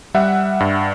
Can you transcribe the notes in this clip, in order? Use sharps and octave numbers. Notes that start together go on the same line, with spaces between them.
G3 E5 F#5
G2